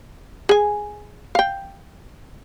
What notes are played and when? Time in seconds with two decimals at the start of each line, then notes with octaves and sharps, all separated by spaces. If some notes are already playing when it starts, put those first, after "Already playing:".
0.49 G#4 G#5
1.35 F5 G5